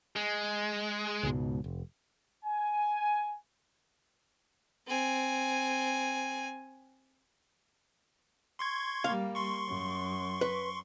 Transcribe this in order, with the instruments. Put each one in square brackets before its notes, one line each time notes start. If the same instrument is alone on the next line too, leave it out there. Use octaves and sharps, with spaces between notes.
[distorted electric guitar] G#3
[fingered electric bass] C#2 G#2 B2
F1
[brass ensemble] G#5
[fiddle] C4 G#5
[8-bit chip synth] C6 C#6 G#6
[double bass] G3 A#3 [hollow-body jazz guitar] F5
[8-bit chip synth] C6 C#6
[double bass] F#2
[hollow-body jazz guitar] B4